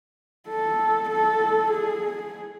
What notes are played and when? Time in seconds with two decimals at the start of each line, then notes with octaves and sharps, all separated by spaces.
0.49 A4
1.10 A4
1.71 G#4